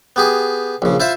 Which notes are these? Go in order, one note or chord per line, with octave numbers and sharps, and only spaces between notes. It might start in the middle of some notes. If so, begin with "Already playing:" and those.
B3 G4 G#4
A#1 C#3
E4 F4 C5 E5